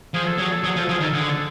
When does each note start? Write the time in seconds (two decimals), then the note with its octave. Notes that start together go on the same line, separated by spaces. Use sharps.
0.14 F3 G#4
0.27 A4
0.38 F#3 G#4
0.53 A4
0.64 F#3 G#4
0.76 F3
0.79 A4
0.89 F3
0.92 G#4
1.01 D#3
1.04 A4
1.13 D3 G#4
1.30 A4